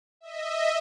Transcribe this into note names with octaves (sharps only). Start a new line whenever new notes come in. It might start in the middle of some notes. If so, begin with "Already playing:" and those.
D#5 E5